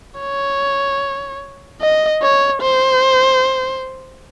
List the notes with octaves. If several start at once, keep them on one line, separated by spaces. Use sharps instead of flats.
C#5
D#5
C#5
C5